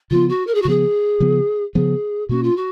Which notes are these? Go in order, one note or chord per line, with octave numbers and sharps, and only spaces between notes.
C#3 F3 B3 F4
F#4
A#4
G#4
F#4
C#3 F3 B3 G#4
C#3 F3 B3
C#3 F3 B3 G#4
B2 A#3 C#4 F#4
F4
F#4